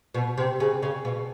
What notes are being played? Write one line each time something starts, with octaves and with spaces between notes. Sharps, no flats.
B2
C3
C#3
C#3
B2